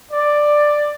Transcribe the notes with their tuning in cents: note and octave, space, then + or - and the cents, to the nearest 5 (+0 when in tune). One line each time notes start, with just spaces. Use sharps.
D5 +10